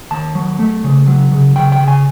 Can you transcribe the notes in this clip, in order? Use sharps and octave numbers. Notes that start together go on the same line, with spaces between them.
D#2 A5
F#3
A3
C#3
F#3
C#3
C#3 G5
G5
C#3
G#5